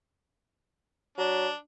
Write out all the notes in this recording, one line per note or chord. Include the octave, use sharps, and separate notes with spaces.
F#3 D4